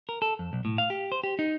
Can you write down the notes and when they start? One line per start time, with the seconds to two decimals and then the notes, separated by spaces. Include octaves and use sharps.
0.09 A#4
0.22 A4
0.39 F2
0.53 B1
0.65 A2
0.78 F5
0.90 G4
1.12 C5
1.24 G4
1.39 D#4